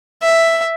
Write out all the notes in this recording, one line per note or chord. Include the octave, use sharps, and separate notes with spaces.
E5